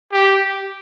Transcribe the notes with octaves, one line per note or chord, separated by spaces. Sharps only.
G4